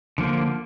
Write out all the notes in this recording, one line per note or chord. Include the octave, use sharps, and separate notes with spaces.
D3 F3 A#3